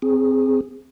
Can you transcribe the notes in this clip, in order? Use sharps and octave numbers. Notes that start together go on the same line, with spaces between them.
C4 G#4